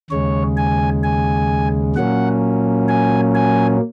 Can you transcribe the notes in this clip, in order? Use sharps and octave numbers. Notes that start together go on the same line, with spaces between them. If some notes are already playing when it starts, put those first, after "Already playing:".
D#2 C#3 G#3 C#5
G#5
G#5
A#2 F#3 A#3 C#4 F#5
G#5
G#5